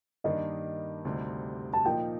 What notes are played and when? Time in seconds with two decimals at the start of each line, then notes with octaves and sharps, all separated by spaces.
0.24 G2 D#3 A#3 D4 D#5
1.04 D2 C3 G3 C4 D#4
1.73 A5
1.85 A#2 F3 A#3 D#4 G5